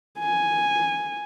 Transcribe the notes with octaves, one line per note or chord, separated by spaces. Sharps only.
G#5